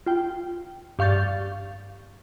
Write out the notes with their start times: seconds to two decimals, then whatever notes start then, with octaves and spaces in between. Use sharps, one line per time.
0.06 F4 G5
0.99 G2 F5 C#6 G6 A6